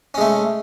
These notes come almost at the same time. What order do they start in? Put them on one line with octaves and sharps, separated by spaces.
C#4 G#3 A3